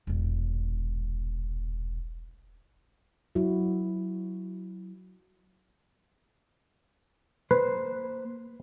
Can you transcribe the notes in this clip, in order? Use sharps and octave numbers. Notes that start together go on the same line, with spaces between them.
E1 A#1
F#3 E4 F#4
A#3 B4 C5